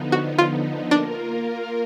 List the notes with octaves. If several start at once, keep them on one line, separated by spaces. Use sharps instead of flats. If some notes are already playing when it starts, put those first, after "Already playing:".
Already playing: D3 F3 B3 D#4
F#4
F4
A#3 D4 F4 A#4